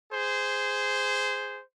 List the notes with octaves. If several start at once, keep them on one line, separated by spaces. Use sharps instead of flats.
G#4 C5